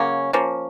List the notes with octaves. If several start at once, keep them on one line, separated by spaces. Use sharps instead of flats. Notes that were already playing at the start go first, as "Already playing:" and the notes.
Already playing: C#3 F#3 A#3 C#4
F3 A#3 C#4